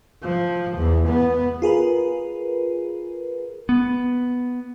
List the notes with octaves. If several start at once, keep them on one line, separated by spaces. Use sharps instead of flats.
F3
E2
B3
F4 G#4 A#4 B4
B3